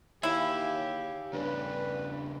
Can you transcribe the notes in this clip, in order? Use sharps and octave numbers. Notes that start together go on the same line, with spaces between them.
D#2 E4 G4 C#5 F5
G2 C#3 G3 B4